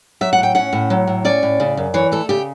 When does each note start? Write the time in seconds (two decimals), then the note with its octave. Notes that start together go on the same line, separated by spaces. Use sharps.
0.21 F#3 E5
0.33 F#5
0.38 A2 G5
0.55 C#4 F#5
0.73 A2
0.90 F#3
1.07 A2
1.25 C#4 D5
1.43 A2
1.60 C#3
1.77 F#2
1.94 E3 C#5
2.12 A3 A4
2.29 C#3 G4